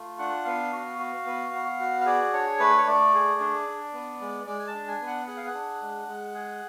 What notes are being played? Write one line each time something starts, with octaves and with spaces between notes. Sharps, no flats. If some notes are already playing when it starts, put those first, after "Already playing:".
Already playing: A3 F4
D4 F#5
B3 F5
F#4
F#4
B3
B3
F#4
F5
G#4 D5
D4 C#5
A3 B4
C#5
A3 D5
G#4
D4
D4
B3
G#3
G#3 D5
G#5
A5
D4
G#5
B3
F#5
G#4 F#5
F5
F#5
D4
G#3
G#3
G#4